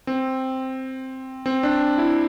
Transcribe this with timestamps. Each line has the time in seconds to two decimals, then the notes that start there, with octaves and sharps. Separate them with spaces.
0.07 C4
1.46 C4
1.63 D4
1.98 E4